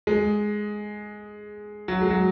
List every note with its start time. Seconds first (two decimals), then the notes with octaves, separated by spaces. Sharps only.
0.07 G#3
1.88 F#3
2.02 G#3
2.10 F#3